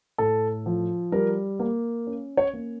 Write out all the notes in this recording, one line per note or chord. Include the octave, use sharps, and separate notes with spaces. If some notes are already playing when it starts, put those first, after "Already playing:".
A2 A4
F3
G3 A#4
A#3
C#4
C#5
A#3